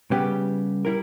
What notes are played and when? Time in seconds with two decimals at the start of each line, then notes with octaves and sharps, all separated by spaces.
0.11 C#3 G3 B3 G4
0.85 G3 E4 A#4